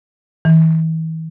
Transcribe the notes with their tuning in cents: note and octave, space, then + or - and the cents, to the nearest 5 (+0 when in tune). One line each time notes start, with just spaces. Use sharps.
E3 -40